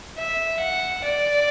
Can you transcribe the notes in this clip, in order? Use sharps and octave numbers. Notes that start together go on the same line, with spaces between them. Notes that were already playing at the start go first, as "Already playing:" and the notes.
E5
F#5
D5